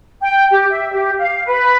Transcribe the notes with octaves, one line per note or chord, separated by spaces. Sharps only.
G5
G4
E5
G4
F5
B4